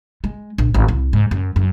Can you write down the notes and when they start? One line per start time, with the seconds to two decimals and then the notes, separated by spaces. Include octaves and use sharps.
0.24 G#3
0.58 A#1
0.74 G#1
0.88 C2
1.13 G#2
1.31 F#2
1.56 F#2